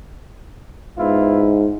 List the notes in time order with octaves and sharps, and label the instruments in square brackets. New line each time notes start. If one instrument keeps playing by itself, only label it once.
[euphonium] G#2 [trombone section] B3 E4 F4